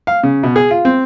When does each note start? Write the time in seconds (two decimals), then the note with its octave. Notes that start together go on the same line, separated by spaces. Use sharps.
0.07 F5
0.23 C#3
0.43 B2
0.56 G#4
0.71 F4
0.85 C4